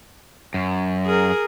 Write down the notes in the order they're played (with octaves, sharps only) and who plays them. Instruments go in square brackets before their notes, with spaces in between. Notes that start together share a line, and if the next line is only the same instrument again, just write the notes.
[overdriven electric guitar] F#2
[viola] G#4 A#4